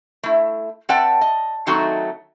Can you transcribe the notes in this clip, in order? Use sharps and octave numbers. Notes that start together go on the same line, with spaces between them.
A3 E4
C4 B4 D5 F#5 G5 A5
D#5
D#3 F#3 A3 C4 D#4 F#4